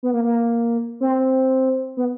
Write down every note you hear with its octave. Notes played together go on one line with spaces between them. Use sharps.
B3
A#3
A#3
C4
B3